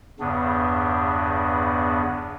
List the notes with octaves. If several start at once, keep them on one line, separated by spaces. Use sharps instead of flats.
E2 G2 C#3 B3 D4